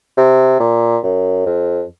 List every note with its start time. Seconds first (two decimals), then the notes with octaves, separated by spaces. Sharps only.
0.17 C3
0.60 A#2
1.03 F#2
1.46 F2